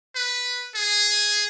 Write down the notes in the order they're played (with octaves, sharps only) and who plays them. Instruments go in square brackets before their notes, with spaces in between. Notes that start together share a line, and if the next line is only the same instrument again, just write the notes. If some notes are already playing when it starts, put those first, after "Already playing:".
[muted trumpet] B4
G#4